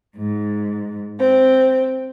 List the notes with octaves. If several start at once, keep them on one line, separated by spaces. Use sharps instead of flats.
G#2
C4